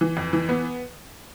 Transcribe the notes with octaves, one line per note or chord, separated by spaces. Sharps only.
E3
F2
E3
B3